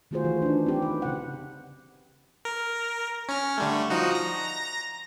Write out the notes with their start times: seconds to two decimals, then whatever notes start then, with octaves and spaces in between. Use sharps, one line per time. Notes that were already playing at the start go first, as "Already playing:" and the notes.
0.11 D#3 A3 F4 F#4 G#4 C5
0.24 E3
0.42 D4 D#4
0.66 C4 G4
0.82 B4
1.02 C#3 F#5
2.45 A#4
3.29 C#4 F6
3.58 D3 G3 A3
3.90 F3 D#4 F#4
4.11 A#5 A#6